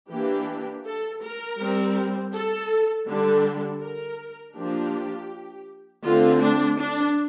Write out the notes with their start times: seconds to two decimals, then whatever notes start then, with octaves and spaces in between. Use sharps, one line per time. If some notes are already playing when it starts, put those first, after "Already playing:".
0.11 E3 A#3 D4 G4
0.85 A4
1.22 A#4
1.59 G3 C4
2.34 A4
3.08 D3 G3 D4 A4
3.82 A#4
4.56 F3 A#3 D4 G4
6.05 D3 A3 C4 F4
6.41 D4
6.79 D4